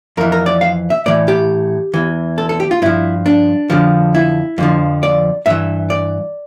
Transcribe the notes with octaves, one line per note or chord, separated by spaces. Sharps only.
F2 E3 A#4
A#4
D5
F5
E5
A2 E3 D5
G4
E2 E3
A4
A4
G4
F4
G2 F3 E4
D4
F2 D3 F3
E4
F2 D3 F3
D5
G2 E3 E5
D5